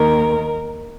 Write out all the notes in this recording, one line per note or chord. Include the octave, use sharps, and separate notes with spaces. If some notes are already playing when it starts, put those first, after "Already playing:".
Already playing: D#2 D#3 A#4